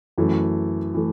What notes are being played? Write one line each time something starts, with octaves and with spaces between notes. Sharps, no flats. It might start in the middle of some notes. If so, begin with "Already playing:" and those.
F#2 E3 A3
E3 A3